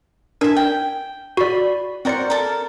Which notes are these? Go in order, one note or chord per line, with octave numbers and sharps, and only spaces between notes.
D4 A#4 E5 G#5
G5
F#4 D5 B5
C4 F#4 A#4 C5 D5 C#7
A4 A#4